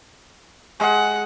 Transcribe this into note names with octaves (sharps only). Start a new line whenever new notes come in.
G#3 F#5